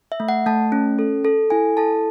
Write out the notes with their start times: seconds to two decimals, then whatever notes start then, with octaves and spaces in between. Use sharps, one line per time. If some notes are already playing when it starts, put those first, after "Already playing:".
0.12 E5
0.20 A3
0.29 F#5
0.46 A3 A5
0.72 C#4
0.99 A4
1.25 A4
1.50 E4 G#5
1.77 A4 A5